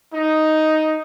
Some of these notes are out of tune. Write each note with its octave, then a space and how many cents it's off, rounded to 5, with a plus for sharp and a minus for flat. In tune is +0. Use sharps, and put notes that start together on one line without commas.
D#4 +5